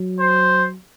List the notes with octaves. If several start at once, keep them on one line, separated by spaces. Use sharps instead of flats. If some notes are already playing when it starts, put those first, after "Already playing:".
Already playing: F#3
C5